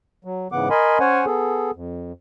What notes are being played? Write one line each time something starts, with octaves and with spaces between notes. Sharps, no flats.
F#3
G#2 C#3 E3 B3 F#5 D6
A#4 D#5 G#5 B5 C6
C#4 C5 C#5 F#5 G#5
B3 G#4 A4
F2